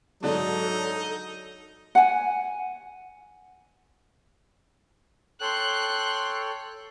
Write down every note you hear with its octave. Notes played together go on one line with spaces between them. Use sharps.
G#2 D3 F#3 D4 D#4 A4
F#5 G#5
A4 C#5 G5 C6 F#6